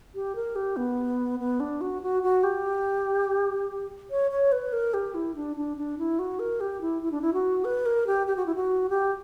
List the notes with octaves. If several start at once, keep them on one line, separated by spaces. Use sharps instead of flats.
G4
A#4
G4
B3
B3
D4
F#4
F#4
F#4
G4
C#5
C#5
B4
A#4
G4
E4
D4
D4
D4
E4
F#4
A#4
G4
E4
E4
D4
E4
F#4
B4
A#4
G4
G4
F#4
E4
F#4
G4